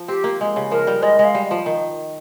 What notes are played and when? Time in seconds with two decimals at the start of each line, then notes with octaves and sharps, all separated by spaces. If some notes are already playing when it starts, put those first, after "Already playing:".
Already playing: F3
0.08 C4 G4
0.24 A#3
0.41 G#3
0.56 C#3
0.71 F3 A#4
0.87 G3
1.02 G#3 D#5
1.19 G#3
1.24 F5
1.35 G3
1.51 F3
1.66 D#3